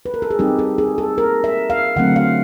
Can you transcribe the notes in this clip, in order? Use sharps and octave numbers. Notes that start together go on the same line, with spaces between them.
B4
A#4
A4
G#4
G3 C4 D#4 G4
A4
G#4
A4
A#4
E5
F5
D3 F#3 A3 C4 F#5
F5